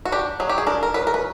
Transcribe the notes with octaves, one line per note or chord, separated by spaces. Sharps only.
F#4
D4 G4
F#3 G#4
G4
G#4
D4 A#4
A#4
F#3 B4
A#4
B4